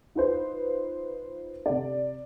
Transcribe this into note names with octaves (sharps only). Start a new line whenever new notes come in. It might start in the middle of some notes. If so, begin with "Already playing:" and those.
D#4 F4 B4 C5
C3 D5